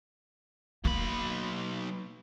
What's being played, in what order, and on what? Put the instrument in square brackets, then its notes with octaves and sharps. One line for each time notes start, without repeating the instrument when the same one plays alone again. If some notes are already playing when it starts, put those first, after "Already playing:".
[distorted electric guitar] B1 B5 [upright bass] A#3